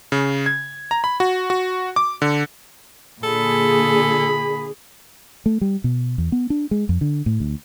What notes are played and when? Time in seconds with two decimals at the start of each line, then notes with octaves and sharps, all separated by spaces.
0.12 C#3
0.46 G#6
0.91 A#5
1.04 B5
1.20 F#4
1.50 F#4
1.96 D6
2.22 D3
3.23 A#2 D3 G#4 A4 B5
5.46 A3
5.61 G3
5.84 B2
6.18 E2
6.32 B3
6.50 D4
6.71 G#3
6.89 F2
7.01 D3
7.26 A2
7.40 D2